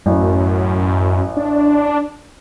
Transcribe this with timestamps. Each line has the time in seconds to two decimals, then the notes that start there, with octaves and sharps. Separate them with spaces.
0.06 A1 F#2
1.37 D4